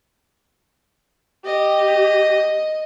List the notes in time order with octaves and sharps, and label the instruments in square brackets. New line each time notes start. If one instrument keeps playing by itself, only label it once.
[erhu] G4 [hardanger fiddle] D#5